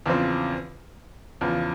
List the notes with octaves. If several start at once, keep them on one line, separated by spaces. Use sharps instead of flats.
E2 C#3 F3 C4
E2 C#3 F3